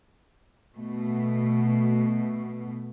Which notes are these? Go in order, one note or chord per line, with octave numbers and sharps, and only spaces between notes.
B2 A3